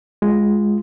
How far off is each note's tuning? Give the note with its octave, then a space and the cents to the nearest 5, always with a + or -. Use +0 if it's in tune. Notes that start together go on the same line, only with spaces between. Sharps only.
G#3 +0 F4 +0